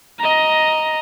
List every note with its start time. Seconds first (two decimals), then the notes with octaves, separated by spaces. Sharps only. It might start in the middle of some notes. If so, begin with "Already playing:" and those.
0.19 D#5 A#5